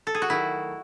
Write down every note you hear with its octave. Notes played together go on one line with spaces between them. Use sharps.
A4
G#4
F#4
D#3 F#3 A3 E4